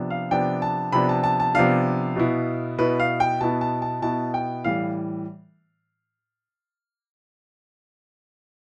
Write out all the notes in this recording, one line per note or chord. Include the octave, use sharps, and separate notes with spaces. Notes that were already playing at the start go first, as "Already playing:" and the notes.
Already playing: C3 F3 B3 D4
F5
C3 F3 B3 D4 G5
A5
C3 F3 B3 D4 B5
A5
A5
A5
C3 F3 B3 D4 F5
B2 B3 E4
B2 B3 E4 B4
F5
G5
B2 B3 E4 A5
A5
A5
B2 B3 E4 A5
G5
A2 E3 G3 F5